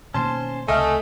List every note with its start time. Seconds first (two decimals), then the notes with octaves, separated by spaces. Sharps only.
0.14 B2 D#3 A#3 C#4 C5 A5 C6
0.68 C#2 C3 A3 D#5 F5 G#5 F6